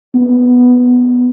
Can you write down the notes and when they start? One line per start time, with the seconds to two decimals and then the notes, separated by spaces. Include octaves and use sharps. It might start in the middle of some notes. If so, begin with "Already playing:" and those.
0.15 B3